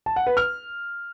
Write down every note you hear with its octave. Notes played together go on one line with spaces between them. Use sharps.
A5
F#5
B4
F6